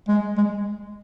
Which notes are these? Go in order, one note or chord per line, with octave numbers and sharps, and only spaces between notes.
G#3
G#3